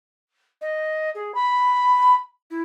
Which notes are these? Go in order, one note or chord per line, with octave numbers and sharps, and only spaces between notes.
D#5
G#4
B5
E4